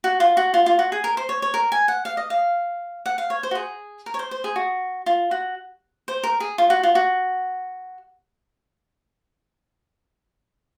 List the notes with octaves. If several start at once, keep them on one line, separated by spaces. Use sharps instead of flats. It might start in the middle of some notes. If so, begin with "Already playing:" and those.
F#4
F4
F#4
F4
F4
F#4
G#4
A#4
C5
C#5
C#5
A#4
G#5
F#5
F5
D#5
F5
F#5
F5
C#5
C5
F#4
G#4
A#4
C#5
C5
C5
G#4
F#4
F4
F#4
C5
A#4
G#4
F4
F#4
F4
F#4